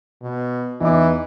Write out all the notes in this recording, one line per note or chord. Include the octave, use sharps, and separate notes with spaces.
B2
E2 E3 D#4 D6